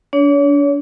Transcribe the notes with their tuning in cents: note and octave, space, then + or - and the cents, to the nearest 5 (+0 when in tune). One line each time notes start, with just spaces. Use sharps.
D4 -35 C#5 +30